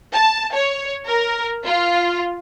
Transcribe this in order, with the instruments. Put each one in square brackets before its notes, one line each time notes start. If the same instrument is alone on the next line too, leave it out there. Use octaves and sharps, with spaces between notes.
[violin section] A5
C#5
A#4
F4